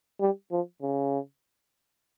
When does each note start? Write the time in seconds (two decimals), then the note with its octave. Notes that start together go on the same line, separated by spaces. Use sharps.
0.20 G3
0.51 F3
0.82 C#3